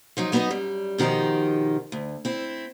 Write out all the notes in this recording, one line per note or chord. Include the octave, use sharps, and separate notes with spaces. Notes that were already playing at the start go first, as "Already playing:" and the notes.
F3 F#3 D#4
F#3 B3 D#4 A#4 B4 D#5
F#2 G3
B2 D#3 F3 D#4 G4
D2
C4 E4